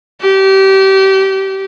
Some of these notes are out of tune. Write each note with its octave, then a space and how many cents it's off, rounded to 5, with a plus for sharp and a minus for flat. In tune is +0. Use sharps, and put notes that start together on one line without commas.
G4 -25